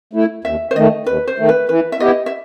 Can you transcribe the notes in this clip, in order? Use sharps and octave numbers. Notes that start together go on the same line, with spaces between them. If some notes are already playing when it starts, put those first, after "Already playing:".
A3 E4
D#2 E5
C5
D#3 A3 D#5
D#2 B4
C5
D#3 A3
B4
E3 B4
E5
B3 E4 G4 D#5
E5